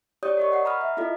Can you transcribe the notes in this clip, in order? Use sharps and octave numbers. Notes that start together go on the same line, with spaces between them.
G4 C#5 D5 D#6 G6
A#4 D#5 C#6
F#5 C7
A#5 B5 D#6 F6
E5
E4 F4 A4 D#5